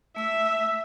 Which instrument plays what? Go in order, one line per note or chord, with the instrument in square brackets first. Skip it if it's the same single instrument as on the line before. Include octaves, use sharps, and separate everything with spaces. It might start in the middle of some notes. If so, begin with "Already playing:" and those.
[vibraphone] A3 E6 [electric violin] E5